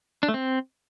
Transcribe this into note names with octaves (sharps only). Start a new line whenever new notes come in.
D4
A3
C4